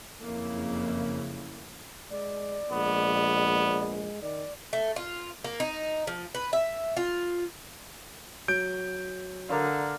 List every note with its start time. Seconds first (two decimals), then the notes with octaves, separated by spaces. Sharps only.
0.22 F#1 F2 C#3 A#3 E4
2.11 G#3 D5
2.71 A#1 G#3 B3
4.22 D#3 D5
4.73 A3
4.96 F4
5.44 A#3
5.60 D#4
6.07 F3
6.35 B4
6.53 E5
6.97 F4
8.48 F#3 G6 D7
9.49 D3 A#4 D5 F5